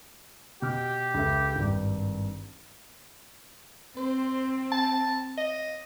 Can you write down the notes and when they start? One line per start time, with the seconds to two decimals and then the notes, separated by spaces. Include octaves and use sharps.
0.62 B2 G4 F6
1.14 C#2 A4 E5
1.55 G#1 G2
3.97 C4 C5
4.72 A5
5.38 D#5